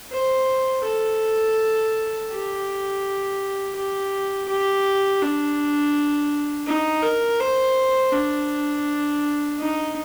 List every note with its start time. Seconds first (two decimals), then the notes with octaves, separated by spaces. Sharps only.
0.12 C5
0.84 A4
2.30 G4
3.75 G4
4.48 G4
5.22 D4
6.67 D#4
7.03 A#4
7.40 C5
8.13 D4
9.58 D#4